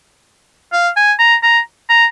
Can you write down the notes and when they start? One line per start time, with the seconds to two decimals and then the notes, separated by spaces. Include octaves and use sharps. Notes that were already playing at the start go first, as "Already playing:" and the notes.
0.73 F5
0.97 G#5
1.19 A#5
1.43 A#5
1.90 A#5